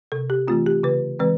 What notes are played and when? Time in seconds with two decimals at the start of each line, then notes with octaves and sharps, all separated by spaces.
0.12 C3 A4
0.30 G4
0.48 E3 A3 C4 F4
0.66 G4
0.83 C#3 B4
1.19 E3 G#3 C4 B4